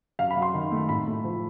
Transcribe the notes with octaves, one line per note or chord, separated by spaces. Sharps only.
F#2 F5
B5
F#3
C6
D#3
A3
A2 B5
A3
F3